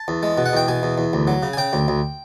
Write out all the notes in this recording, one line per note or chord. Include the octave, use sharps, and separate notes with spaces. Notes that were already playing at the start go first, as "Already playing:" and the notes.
Already playing: A5
E2
G#3
B2
F#5
E2 G5
B2 G#5
E2
E2
D2
F#3
C#3
G#5
C#3 G5
D2
D2